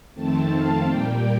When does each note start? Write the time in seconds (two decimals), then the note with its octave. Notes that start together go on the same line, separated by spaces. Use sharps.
0.14 F2 D#3 A3 C4 A5
0.49 F5
0.85 A#2 G3 A#3 G5